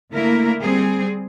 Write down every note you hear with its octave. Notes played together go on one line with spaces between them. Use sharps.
D3 A3 A#3 E4 A#4
G3 C4 G#4